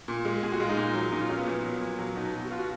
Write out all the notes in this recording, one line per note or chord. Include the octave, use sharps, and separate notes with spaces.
A#2
G#3
A#2 G#4
F#4
G#3 F4
D#4
A#2
F#3
A#2 D#4
F4
F#3 C#4
B3
A#2
F#3
A#2
F#3
B2 D#4
F#3
F#4
B2 F4
F#4